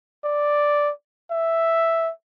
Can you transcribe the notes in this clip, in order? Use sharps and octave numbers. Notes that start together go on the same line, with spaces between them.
D5
E5